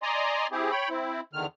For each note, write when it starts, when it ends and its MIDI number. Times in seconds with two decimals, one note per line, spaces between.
0.03 0.47 74
0.03 0.47 75
0.03 0.47 80
0.03 0.47 82
0.03 0.47 84
0.52 0.71 60
0.52 0.71 64
0.52 0.71 67
0.52 0.71 68
0.71 0.89 73
0.71 0.89 79
0.71 0.89 83
0.90 1.21 60
0.90 1.21 64
1.33 1.46 40
1.33 1.46 50
1.33 1.46 51
1.33 1.46 89